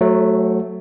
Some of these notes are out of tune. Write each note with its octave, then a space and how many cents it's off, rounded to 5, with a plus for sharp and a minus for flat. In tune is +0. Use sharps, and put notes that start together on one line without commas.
F#3 +0 A3 +0 C5 +45